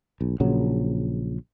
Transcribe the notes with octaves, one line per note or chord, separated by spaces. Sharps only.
B1
A#1 A#2 C#3 F#3